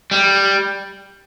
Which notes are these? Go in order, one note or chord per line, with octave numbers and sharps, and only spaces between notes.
G3